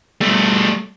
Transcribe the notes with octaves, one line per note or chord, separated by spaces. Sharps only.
G3 A3